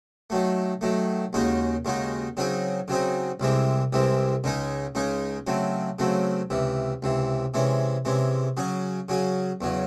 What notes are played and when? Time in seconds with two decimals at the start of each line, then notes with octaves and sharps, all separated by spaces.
0.30 D#3 F#3 A3
0.81 D#3 F#3 A3
1.33 D#2 C#3 G#3 D#4 F#4
1.85 D#2 C#3 G#3 D#4 F#4
2.37 C#3 F#3 C4 D#4 G#4
2.88 C#3 F#3 C4 D#4 G#4
3.40 C2 C3 E3 G#3 C4
3.93 C2 C3 E3 G#3 C4
4.44 C#2 C#3 G#3 D#4 G#4
4.95 C#2 C#3 G#3 D#4 G#4
5.47 C#3 F#3 A3 C4
5.99 C#3 F#3 A3 C4
6.50 C#2 C3 E3
7.03 C#2 C3 E3
7.54 C3 E3 G#3 C#4
8.05 C3 E3 G#3 C#4
8.57 C#3 F#3 C#4 G#4
9.09 C#3 F#3 C#4 G#4
9.61 E2 C#3 F#3